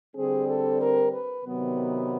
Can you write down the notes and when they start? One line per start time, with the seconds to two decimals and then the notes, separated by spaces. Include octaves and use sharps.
0.14 D3 G3 C4 G#4
0.47 A4
0.80 A#4
1.12 B4
1.44 C3 D#3 F#3 B3